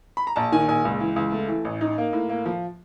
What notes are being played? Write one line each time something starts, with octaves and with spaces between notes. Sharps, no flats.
B5
A#5
A#1 A5
D#3 G#5
A#1 G#5
C#2
E3
C#2
A3
E3
A1
D#4
A#3
A2
A#3
F3